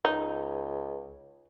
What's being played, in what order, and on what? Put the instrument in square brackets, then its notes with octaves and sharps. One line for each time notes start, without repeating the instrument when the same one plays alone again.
[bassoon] C#2 [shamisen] D#4